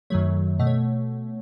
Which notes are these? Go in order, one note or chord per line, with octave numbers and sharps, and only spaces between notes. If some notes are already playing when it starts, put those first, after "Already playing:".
F#2 D#3 F#3 A3 C#5
B2 A3 D#5
C#5